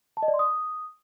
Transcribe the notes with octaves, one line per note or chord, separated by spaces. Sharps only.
A5
D#5
D5
C6
D#6